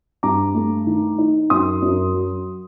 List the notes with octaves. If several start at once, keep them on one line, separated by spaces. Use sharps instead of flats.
G2 A#5 D6
A3
D#3
D#4
F#2 C6 D#6
F#2
F#3